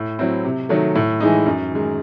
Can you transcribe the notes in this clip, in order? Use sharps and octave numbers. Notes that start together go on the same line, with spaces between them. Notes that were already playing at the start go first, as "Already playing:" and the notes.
Already playing: A2
F#3 C4 E4
C3
D#3 F#3 A3
A2
E3 G#3 D#4
F#2
D#3 G#3